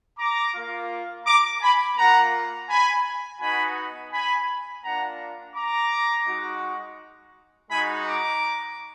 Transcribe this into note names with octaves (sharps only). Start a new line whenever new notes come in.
A#5 D6
A#3 F4
A#5 D6
G#5 B5
A#3 F4 F#5 A#5
G#5 B5
B3 D#4 F#4 G#5 B5
G#5 B5
A#3 D4 F4 F#5 A#5
A#5 D6
G#3 D#4 F#4
G#3 D#4 F#4 G#5 B5
A#5 D6